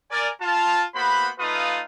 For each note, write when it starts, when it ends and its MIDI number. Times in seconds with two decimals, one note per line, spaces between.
0.11 0.29 70
0.11 0.29 74
0.11 0.29 80
0.41 0.83 65
0.41 0.83 81
0.95 1.30 58
0.95 1.30 59
0.95 1.30 66
0.95 1.30 72
0.95 1.30 83
1.39 1.82 57
1.39 1.82 63
1.39 1.82 65
1.39 1.82 71
1.39 1.82 77
1.39 1.82 87